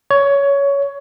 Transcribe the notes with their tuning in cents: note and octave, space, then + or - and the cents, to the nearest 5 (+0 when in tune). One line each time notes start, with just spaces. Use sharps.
C#5 +15